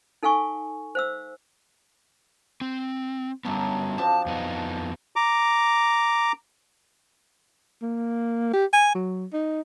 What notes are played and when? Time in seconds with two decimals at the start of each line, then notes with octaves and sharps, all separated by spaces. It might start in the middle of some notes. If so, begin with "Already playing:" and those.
0.23 D#4 A4 F5 G#5 C#6
0.95 C5 F5 E6
2.61 C4
3.45 F#2 D3 G3 B3 A#5
3.98 F3 C4 D4 A5
4.26 F2 B3 D#4
5.16 A#5 D6
7.82 A#3
8.53 G4
8.73 G#5
8.95 F#3
9.33 D#4